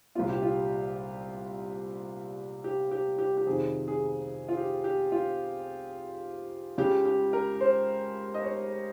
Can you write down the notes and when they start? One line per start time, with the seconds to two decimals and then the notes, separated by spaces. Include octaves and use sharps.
0.15 C2 A#2 G3 F4
0.29 G4
0.43 F4
2.64 G4
2.91 G4
3.18 G4
3.37 G4
3.47 F2 C3 D#3 G#4
3.88 G#4
4.48 F4
4.57 G4
4.84 G4
5.12 F4
6.78 C#2 C#3 G#3 G4
7.05 G4
7.33 A#4
7.61 C5
8.34 D#5
8.43 C#5